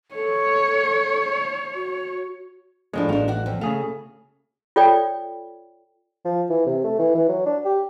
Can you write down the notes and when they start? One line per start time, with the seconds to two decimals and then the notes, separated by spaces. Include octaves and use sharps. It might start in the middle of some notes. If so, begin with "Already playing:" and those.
0.15 A4 C#5
1.74 F#4
2.93 A2 F3 G#3 D4 A4 C#5
3.09 A1 G#3 D4 D#4 F5
3.28 F#4 D5 F#5
3.46 F2 C4
3.61 C#3 A3 G#4 F5
4.76 F4 A4 C#5 D5 G5
6.25 F3
6.50 E3
6.66 C3
6.84 A3
6.99 E3
7.15 E3
7.29 F#3
7.46 D4
7.65 G4